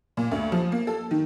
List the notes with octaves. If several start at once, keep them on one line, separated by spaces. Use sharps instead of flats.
A#2
D2
F3
A#3
A4
D#3